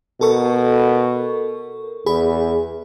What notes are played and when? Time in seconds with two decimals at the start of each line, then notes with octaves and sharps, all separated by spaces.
0.21 B2 A4 A#4 C#6
2.06 E2 G#4 B5